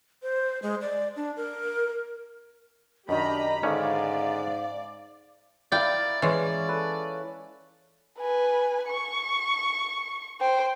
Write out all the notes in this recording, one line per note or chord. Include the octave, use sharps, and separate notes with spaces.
C5
G#3
D5
D4
A#4
F#2 D#3 D4 G4 D#5 A#5 B5
G#2 D3 D#3 C#4 D5 F5
E4 A#4 D5 F5 G5
E3 G#3 C#4 D5
A4 B4
B4 G#5
C#6
C5 G5